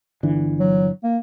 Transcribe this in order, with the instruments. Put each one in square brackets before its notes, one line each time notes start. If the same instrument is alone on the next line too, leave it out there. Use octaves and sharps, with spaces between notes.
[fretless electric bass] G1 D3 E3
[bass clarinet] F#3
A#3